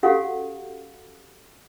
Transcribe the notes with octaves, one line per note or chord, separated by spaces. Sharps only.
C#4 F#4 G4 A4 F5 F#5